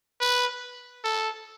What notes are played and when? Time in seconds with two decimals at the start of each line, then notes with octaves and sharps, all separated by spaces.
0.20 B4
1.04 A4